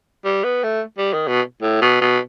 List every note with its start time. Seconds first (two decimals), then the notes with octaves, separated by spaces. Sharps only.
0.25 G3
0.44 B3
0.63 A3
0.98 G3
1.13 D#3
1.27 B2
1.62 A2
1.81 B2
2.01 B2